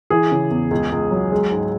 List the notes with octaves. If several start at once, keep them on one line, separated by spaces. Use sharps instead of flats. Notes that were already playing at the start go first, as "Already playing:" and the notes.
E3 G#4
C#3
E2
C#2
C#2
F#3
G#3
G#2